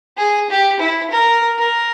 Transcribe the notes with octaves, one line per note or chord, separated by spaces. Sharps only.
G#4
G4
E4
A#4
A#4